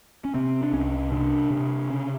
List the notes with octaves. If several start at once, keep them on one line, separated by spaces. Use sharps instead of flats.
C#4
C3 C4
D4
C2 C#4
C3 D4
C3
C#3 C#4